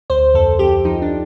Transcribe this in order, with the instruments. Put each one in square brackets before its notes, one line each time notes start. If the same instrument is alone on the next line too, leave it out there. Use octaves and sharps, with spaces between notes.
[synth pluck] D2 C5
F2 A4
F2 G4
F3 D#4
D4